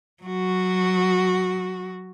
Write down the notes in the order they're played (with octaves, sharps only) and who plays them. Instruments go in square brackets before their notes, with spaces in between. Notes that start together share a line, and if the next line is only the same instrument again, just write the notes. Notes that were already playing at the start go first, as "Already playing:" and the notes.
[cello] F#3 F#4